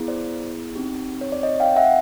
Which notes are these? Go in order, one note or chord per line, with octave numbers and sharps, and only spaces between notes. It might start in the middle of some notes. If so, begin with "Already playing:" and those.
Already playing: B3 E4 G#4
C5 D5
C4 D#4 G4
C#5
D5
C#5 D#5
F5 G5
E5 F#5